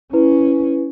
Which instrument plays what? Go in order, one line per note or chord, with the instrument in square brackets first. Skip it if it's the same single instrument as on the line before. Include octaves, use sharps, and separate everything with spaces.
[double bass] C#4 [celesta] E4 B4